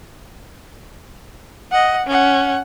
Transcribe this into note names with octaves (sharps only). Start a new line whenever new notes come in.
D#5 F#5
C#4 F#5